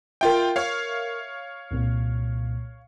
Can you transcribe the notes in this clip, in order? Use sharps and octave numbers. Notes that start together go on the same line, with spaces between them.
F4 A#4 E5 G5
C#5 F5
C2 A#2